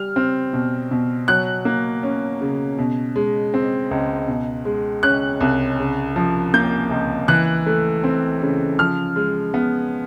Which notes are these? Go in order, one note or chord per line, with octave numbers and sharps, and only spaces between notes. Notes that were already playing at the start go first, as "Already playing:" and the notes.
Already playing: G3 F6
C4
B2
B2
F#3 F#6
A#3
C#4
C#3
B2
G#3
C4
C#2
B2
G#3
C#4 F#6
C2
C#3
F3
A#3 G6
C#2
E3 F#6
A3
C4
C#3
F3 F6
G#3
B3